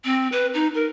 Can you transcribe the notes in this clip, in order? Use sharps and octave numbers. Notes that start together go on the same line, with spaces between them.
C4
B4
D#4
A#4